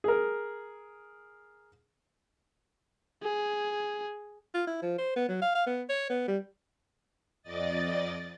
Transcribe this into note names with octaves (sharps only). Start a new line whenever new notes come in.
G#4 A#4
G#4
F4
E4
F3
C5
B3
F#3
F5
F5
B3
C#5
B3
G3
F2 D5 D#5 A6